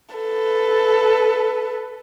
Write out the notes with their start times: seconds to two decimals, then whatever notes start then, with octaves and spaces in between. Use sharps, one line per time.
0.15 A4 B4